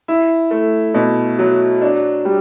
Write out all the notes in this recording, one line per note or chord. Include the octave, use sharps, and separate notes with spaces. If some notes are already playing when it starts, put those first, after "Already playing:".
E4
A3
B2
F#3
D4
G3